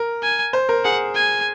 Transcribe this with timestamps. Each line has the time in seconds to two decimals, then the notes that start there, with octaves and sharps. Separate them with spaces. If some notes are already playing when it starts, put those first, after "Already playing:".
Already playing: A#4
0.23 G#5
0.53 C5
0.69 A#4
0.85 G#4 F#5
1.15 G#5